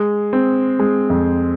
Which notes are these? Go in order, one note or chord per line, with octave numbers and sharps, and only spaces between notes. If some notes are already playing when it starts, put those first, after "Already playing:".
Already playing: G#3
C4
G#3
F2